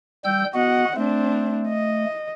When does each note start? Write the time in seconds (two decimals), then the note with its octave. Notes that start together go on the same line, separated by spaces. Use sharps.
0.25 G3 G5 E6 G6
0.54 B3 F#4 D#5 F#5
0.96 A3 C4 D4
1.68 D#5